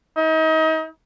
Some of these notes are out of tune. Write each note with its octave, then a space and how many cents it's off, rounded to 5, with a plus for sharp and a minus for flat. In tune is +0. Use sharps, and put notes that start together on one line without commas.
D#4 +35